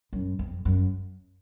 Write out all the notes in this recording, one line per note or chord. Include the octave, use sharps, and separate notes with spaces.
F#2
F2
F#2